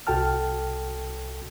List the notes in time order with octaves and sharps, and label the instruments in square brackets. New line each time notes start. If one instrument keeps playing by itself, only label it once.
[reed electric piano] C2 F#4 A4 G5 A5 F6